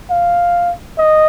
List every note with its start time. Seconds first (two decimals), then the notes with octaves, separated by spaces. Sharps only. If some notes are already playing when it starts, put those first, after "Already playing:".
0.10 F5
0.98 D#5